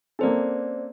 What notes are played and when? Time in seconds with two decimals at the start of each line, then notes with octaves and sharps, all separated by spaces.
0.19 A#3 C4 C#4 A4 C5 D5